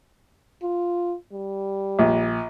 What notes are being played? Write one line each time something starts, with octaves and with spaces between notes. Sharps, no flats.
F4
G3
A#1